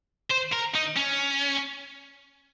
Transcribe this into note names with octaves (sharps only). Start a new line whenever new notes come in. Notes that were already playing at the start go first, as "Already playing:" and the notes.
C5
A#4
D#4
C#4